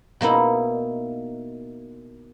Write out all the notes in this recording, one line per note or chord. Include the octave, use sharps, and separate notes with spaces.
B2 A#3 D#4 E4